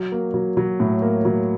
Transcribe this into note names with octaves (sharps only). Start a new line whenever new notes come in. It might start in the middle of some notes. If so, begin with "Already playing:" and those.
Already playing: F#3
A#3
F#3
F#3
A2
A#3
F#3